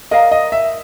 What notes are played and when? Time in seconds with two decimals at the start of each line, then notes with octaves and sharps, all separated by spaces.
0.11 A#4 D5 D#5 F5 A#5
0.32 D#5
0.52 E5